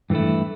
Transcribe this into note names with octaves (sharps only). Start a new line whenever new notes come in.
G2 E3 A3 E4